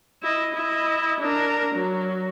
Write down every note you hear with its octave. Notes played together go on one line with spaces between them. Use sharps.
E4 D#5
E4 D#5
D4 A#4
F#3